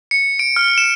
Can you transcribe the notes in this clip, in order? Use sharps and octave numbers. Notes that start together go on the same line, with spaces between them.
C#7
D7
F6
E7